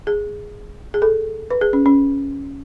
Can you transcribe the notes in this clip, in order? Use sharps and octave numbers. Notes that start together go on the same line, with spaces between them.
G#4
G#4
A4
B4
G#4
C#4
C#4